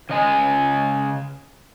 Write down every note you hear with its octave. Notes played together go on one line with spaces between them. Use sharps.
C#3 D#5 G#5